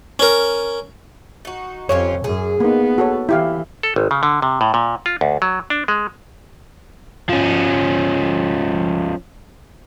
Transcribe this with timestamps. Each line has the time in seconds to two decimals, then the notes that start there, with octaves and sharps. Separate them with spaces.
0.19 C#4 A#4
1.45 D#4 F#4
1.89 F2 C#4 F4 G4 C#5
2.24 F#2 G#4
2.60 A#3 B3 D#4
2.98 F#4 A4 C#5
3.29 E3 E4 G4 F5
3.83 A4
3.96 G#1
4.11 C#3
4.23 D3
4.42 C3
4.61 A2
4.74 A#2
5.06 F4
5.21 D2
5.42 F#3
5.70 D4
5.88 G#3
7.29 F3 C#4